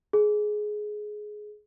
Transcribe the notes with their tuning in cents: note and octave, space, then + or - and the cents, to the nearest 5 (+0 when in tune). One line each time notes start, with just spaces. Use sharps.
G#4 +15